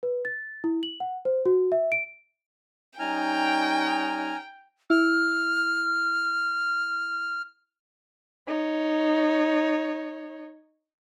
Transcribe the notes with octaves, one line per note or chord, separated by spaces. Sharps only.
B4
A6
E4
F#7
F#5
C5
F#4
E5
D7
G3 C#4 D#4 G5 G#5 A#5 F6
E4 F6
D#4 C#5